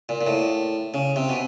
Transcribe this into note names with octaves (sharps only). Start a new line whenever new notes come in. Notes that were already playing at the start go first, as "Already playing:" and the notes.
A#2
A#2
A2
C#3
C3
B2